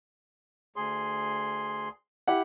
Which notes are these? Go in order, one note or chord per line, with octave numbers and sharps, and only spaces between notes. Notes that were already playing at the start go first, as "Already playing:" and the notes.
D2 G#4 C6
E4 G4 F#5